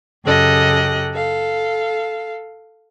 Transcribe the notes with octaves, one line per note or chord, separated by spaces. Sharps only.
F#2 C#3 G4 A4 D#5 F#6
A4 F5